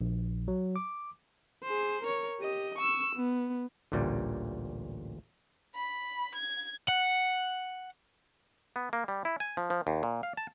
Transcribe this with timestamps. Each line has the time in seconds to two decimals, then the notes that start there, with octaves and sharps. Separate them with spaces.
0.01 A#1
0.48 F#3
0.76 D6
1.64 G#4 C5
2.03 A#4 C#5
2.41 G4 D#5
2.78 C#6 E6
3.15 B3
3.92 A1 D2 A#2 G3
5.75 B5
6.35 G#6
6.88 F#5
8.76 B3
8.93 A#3
9.08 G3
9.25 E4
9.40 G#5
9.57 F3
9.70 F3
9.87 D#2
10.03 A#2
10.23 F5
10.37 A5